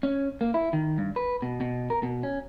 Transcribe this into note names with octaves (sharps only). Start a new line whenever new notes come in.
C#4
A#3
E4
D#3
G2
B4
B2
B2
A#4
B2
C#4